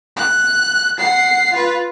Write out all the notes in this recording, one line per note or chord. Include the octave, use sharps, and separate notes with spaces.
F#6
F#5 C7
F4 B4